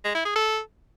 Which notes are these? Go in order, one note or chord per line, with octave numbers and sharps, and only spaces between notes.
G#3
E4
G#4
A4